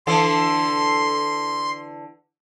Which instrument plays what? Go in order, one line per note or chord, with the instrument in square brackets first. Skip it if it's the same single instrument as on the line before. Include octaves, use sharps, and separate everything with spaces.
[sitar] D3 E3 A4 [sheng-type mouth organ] C6